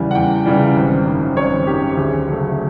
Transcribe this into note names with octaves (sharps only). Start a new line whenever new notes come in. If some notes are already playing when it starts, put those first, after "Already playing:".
Already playing: E2 C#3 E3 G3 G#5
F#5
E2 G5
C#3 E3 G3
G#1
F#2 D#3
G#1 C#5
F#2 D#3 G4
D2 G#4
C#3 F#3 A3